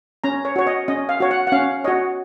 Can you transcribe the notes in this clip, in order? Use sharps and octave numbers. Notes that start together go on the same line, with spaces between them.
C#4 A#5
C#5
F#4 C#5
D#5
C#4 D#5
F5
F#4 C#5
F#5
F#5
C#4 F5
F#4 C#5 D#5